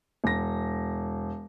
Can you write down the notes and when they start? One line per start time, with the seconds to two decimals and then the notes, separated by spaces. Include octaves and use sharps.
0.24 E1 A#6